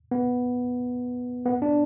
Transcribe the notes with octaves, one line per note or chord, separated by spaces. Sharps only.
B3
B3
D4